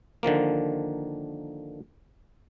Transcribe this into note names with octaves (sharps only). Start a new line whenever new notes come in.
D3 D#3 F3 A#3